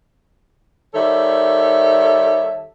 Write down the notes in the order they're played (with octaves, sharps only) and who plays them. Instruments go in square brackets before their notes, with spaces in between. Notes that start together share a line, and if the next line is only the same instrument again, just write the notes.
[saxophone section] D#3 G3 A4 C#5 E5